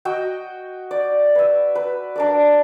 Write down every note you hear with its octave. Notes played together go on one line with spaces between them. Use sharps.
F#4 D#5 G5
D5
B4 E5
B4
D4 A#4 D5